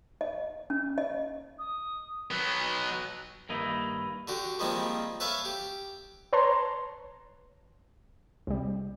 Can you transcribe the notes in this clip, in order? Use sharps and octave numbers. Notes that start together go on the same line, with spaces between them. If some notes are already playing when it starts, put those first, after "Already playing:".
D#5
C#4
D#5
D#6
F#3 B3
G2 D#3 A#3 D#4 E4 D#5
D3 F#4 G4
D#3 F3 G3 G#3 A#3 C4
A4 B4 C#5 E5 F5
G4
B4 C#5 A5 A#5 C6
C2 G3